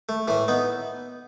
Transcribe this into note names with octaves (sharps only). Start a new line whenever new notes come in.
A3
A2 E3 A3
B3 D#4